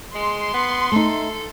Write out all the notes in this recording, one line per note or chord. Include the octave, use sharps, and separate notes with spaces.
G#3 C6
B3
A3 D#4 A4